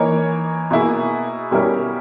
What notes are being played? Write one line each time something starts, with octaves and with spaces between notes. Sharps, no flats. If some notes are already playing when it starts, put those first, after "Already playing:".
Already playing: E3 A#3 D#4 A#4 C#5
B2 A#3 E4 G#4
B2 G3 C#4 E4 A#4